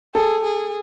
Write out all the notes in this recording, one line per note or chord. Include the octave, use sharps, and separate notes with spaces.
G#4 A4
G#4